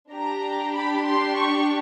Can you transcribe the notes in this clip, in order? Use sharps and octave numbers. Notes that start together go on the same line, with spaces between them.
D4 G4 A#5
B5
C6
C#6